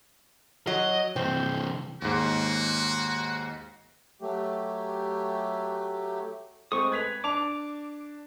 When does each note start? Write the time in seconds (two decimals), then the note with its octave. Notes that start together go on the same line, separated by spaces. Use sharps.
0.67 F#3 D#5
1.16 C3 E3 C4
2.02 D#2 G#2 F#4
4.21 F#3 A3 G4
6.72 G#3 A3 C4 C#6 D#6
6.92 B4 G#6 B6 F7
7.24 D4 A5 D6 F7